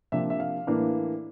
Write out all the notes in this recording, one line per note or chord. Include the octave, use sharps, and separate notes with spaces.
C3 F3 A#3 D4 E5
E5
F5
A2 E3 A#3 D4